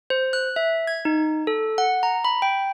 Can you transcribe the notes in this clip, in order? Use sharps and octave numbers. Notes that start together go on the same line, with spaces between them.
C5
F#6
E5
G#6
D#4
A4
F#5
A#5
B5
G5